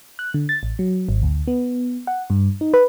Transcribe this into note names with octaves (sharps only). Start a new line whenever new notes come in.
F#6
D3
A6
A1
F#3
G#1
D2
B3
F#5
G2
D#4
B4